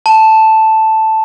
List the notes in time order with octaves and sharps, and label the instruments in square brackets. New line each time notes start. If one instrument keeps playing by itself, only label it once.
[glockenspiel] A5